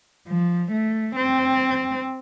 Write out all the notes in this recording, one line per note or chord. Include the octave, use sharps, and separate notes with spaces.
F3
A3
C4